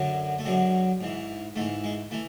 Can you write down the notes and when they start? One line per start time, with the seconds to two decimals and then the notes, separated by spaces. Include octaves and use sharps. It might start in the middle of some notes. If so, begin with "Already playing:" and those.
Already playing: F#2 D3 F#3
0.39 A3
0.45 F#2 D3 F#3 G#3
1.01 G#2 E3
1.56 G#2 A3
1.59 E3
1.84 G#3
2.11 E3 A3